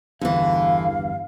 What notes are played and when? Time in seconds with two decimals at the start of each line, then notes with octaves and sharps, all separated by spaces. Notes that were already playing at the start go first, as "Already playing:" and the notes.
0.21 G1 E2 G2 D3 E3 F5